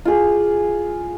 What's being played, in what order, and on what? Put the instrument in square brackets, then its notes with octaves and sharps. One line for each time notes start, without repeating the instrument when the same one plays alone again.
[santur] F4 G#4